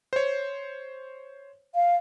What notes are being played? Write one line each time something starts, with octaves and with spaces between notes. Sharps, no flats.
C5 C#5
F5